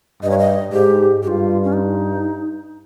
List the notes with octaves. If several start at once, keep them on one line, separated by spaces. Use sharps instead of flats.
G2 D#5
C#5
D#5
G#2 G4
G2 F4 G4
C#4
D#4